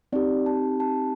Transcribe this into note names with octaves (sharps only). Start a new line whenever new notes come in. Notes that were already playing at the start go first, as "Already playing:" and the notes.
C4 D#4 G4 D5
A5
A5